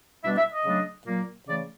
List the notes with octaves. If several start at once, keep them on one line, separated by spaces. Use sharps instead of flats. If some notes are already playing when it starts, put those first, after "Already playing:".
B2 G3 B3 D4 E5
E5
D#5
C#3 F#3 A3 D4
A#2 F#3 A#3
C#3 E3 A3 D5